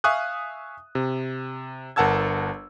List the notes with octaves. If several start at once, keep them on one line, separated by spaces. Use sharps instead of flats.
E5 F5 G#5 C#6 D#6 F#6
C3
G1 A#4 F#5 A5 E6 G#6